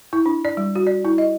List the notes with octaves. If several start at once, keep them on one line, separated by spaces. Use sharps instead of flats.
E4
D4
D5
G3
F#4
D5
E4
D#5